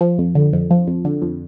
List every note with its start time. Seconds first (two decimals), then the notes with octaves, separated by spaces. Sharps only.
0.01 F3
0.18 F2
0.35 D3
0.53 F2
0.71 F3
0.88 F2
1.05 D3
1.22 F2